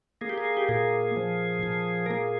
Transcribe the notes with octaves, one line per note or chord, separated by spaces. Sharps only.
A#3 G#4
G4
G#4
G4
A#2 G#4
F3
A#2
A#4
A#3 G#4